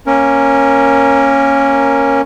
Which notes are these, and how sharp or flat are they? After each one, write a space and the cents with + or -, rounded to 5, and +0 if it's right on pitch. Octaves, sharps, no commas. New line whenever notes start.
A#3 +0 C#4 -10 A#4 +0